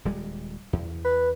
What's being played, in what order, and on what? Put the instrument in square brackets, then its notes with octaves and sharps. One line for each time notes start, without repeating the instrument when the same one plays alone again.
[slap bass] D#1 G3 G#3
E2
[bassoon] B4